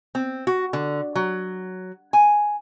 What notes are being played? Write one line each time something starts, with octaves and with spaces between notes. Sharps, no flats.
C4
F#4
D3
F#3
G#5